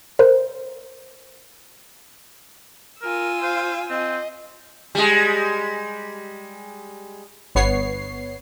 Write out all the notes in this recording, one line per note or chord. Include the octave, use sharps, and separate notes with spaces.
A#4 C5
F4 A#4 G#5 E6
C5 F5
C4 D#5
G3 G#3
G1 B3 C#5 C7